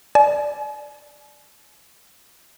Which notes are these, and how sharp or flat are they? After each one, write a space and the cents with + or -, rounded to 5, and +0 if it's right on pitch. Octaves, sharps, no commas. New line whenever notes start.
D5 +0 G#5 +45